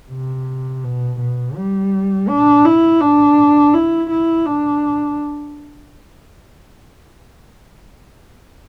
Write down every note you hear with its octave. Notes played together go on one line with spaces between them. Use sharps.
C3
B2
B2
G3
D4
E4
D4
E4
E4
D4